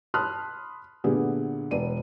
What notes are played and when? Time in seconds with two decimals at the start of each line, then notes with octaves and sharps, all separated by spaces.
0.14 A5 B5 C6 D#6 F6 F#6
1.04 A#2 D3 A3 B3 G4 G#4
1.71 E1 B4 D5 D#7